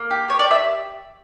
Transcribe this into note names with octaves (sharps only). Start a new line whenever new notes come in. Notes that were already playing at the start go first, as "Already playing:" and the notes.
Already playing: A#3
G4
G4 C#5
D5
G4
E5